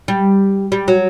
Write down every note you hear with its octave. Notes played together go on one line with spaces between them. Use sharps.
G3
G3
F#3